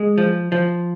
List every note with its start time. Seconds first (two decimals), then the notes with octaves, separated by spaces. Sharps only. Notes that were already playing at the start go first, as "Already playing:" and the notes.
Already playing: G#3
0.18 F3
0.52 F3